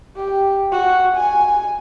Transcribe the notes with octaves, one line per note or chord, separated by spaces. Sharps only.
G4
F#4
G#5